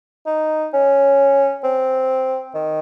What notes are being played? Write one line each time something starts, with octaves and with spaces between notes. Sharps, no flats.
D#4
C#4
C4
D#3